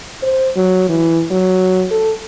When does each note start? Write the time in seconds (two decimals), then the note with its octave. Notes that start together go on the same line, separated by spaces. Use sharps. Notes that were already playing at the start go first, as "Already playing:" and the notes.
0.23 C5
0.56 F#3
0.89 E3
1.31 F#3
1.91 A4